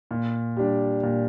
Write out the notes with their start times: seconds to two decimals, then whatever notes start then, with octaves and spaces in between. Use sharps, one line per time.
0.11 A#2
0.56 G3 D4
1.03 A#2